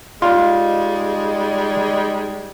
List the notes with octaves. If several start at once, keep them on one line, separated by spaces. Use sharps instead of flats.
G3 G#3 D#4 F4